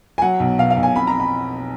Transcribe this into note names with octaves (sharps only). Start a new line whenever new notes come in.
G#5
F#3 F#5
B1
B2 F5
F5
B1
G#5
F2 B5
A#5
B5